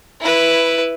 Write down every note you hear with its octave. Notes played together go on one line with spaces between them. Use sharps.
E4 B4